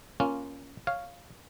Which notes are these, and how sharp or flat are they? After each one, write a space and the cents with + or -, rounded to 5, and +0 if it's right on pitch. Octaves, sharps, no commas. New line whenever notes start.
A#3 +10 C#4 +0 F4 +0
C#5 +0 F5 +0